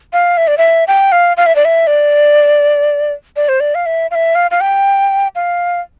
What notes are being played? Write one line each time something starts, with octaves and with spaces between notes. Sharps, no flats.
F5
E5
D5
E5
G5
F5
F5
E5
D5
E5
D5
D5
C5
D5
F5
E5
F5
E5
F5
F5
G5
F5